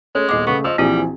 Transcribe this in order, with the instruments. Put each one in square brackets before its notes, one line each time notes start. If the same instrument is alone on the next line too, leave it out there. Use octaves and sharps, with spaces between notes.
[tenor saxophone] G#3 [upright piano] A3 C#4
[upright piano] D#1 B3 [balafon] D#5 D6
[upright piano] C#3 A3 [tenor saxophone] B3 [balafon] C#6
[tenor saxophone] F3 [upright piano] D#5 E6
[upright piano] A#1 E3 F3 [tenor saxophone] G3 [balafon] C4 F#4 G#4